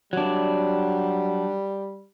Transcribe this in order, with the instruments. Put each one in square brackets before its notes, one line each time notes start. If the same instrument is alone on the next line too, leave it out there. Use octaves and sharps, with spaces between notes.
[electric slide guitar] F#3 D4 [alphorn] G3